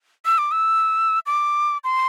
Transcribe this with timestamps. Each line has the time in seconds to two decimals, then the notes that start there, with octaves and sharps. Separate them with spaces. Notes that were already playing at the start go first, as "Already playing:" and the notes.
0.25 E6
0.38 D6
0.52 E6
1.26 D6
1.84 C6